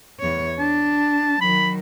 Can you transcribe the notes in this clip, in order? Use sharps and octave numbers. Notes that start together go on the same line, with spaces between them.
E2 C#5
D4 A5
D#3 F#3 B5